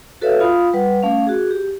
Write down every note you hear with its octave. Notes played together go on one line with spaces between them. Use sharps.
F#4 A4 B4 C#5 E5 F5
F4 F5 B5 D#6
G3 B4 F#5
A3 C#4 F5
F#4 G#4
G4